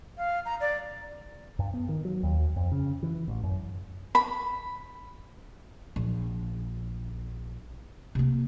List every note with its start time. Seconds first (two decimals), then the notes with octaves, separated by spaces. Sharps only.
0.18 F5
0.45 A#5
0.61 D5
1.59 G2
1.74 B3
1.89 D#3
2.05 F#3
2.23 D#2
2.56 F2
2.72 C#3
3.03 E3
3.28 A1
3.44 F#2
4.15 B5
5.96 A#1
8.15 C3 A#3